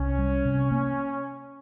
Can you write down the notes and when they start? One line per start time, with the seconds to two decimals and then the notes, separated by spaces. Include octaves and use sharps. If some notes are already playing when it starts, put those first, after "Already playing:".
Already playing: C2 C#4
0.19 G3
0.45 C3
0.71 A#3